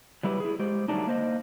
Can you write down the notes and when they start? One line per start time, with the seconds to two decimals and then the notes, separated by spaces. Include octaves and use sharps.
0.23 F#3 G3 E4 G4 B4
0.40 E4 G#4
0.59 G#3 G4 C5
0.88 D3 F#3 G3 A3 D4 D#4
1.07 A#3 C5 D#5